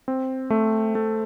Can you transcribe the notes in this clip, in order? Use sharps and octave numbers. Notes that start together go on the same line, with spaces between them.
C4
A3
A3